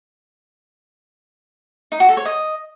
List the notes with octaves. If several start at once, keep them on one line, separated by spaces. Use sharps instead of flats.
D#4
F#4
A4
C#5
D#5